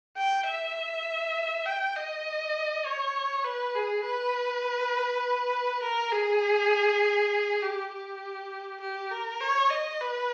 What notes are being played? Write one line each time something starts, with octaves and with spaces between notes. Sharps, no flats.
G5
E5
G5
D#5
C#5
B4
G#4
B4
A#4
G#4
G4
G4
G4
A#4
C#5
D#5
B4